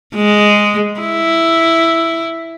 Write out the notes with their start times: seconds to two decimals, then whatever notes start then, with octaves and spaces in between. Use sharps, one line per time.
0.15 G#3
1.00 E4